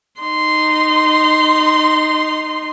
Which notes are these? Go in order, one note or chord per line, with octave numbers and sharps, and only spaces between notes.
D#4 C6